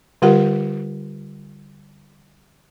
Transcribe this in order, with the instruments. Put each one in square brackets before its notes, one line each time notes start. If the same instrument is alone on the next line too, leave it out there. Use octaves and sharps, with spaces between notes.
[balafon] D3 G3 F4 G4 A#4 F#5